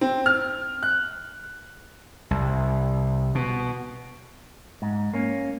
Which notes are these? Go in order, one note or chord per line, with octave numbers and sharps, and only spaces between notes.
C4
F6
F#6
C2
B2
G#2
A#3 C#4